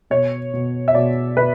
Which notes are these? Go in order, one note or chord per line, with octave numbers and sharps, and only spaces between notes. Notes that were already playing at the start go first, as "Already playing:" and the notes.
B2 C#5
B2
E5
B2 D5
B2 B4